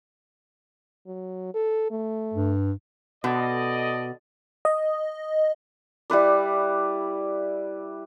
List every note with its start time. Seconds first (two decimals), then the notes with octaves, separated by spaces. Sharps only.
1.07 F#3
1.54 A4
1.91 A3
2.34 G2
3.24 B2 A4 D5 D#5
4.65 D#5
6.10 G3 E4 B4 D5